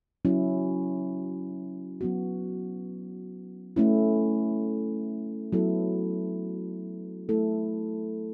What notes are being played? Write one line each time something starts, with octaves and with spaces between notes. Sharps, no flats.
F#3 C#4 E4
F#3 B3 F#4
A3 C#4 E4
F#3 B3 E4 A4
A3 E4 A4